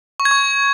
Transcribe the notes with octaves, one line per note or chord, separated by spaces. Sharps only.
C#6
G#6
C#6